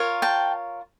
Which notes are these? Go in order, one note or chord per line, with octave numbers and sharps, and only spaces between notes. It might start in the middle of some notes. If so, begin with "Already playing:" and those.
Already playing: F4 A#4 C#5
G5 A5